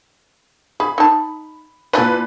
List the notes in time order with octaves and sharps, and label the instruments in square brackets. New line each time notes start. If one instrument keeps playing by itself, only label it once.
[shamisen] G#4 [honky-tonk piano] B5
[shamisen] D#4 A5
[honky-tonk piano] A#2 B4 [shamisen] E3 D4